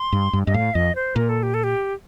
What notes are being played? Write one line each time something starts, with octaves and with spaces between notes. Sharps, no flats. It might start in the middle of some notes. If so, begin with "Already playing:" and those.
Already playing: C6
G2
G2
G2 D#5
A2 F5
F2 D#5
C5
A#2 A#4
A4
G4
A4
G4